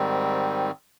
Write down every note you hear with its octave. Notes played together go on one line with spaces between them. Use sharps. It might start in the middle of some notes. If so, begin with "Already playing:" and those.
Already playing: G#2 D#3 G3 C4